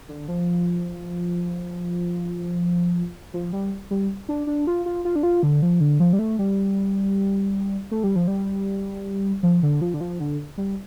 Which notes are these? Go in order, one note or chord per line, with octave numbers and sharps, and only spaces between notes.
D3
F3
F3
G3
G3
D4
D4
F4
F4
F4
D4
F4
D3
F3
D3
F3
G3
A3
G3
A3
G3
F3
G3
F3
D3
F3
D3
F3
D3
G3